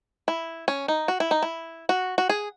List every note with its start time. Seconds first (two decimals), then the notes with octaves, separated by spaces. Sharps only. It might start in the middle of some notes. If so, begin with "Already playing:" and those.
0.28 E4
0.68 C#4
0.88 D#4
1.08 F#4
1.20 E4
1.31 D#4
1.43 E4
1.89 F#4
2.18 F#4
2.29 G#4